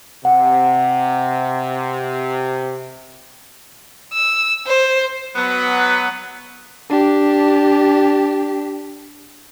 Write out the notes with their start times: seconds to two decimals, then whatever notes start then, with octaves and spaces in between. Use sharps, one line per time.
0.25 C3 F#5
4.13 E6
4.67 C5
5.36 F#3 B3 B4
6.90 D4 G4